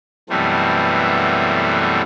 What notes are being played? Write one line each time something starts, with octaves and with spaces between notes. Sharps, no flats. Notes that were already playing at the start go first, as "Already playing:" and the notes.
F#2 B2 E3 G3 A3 C4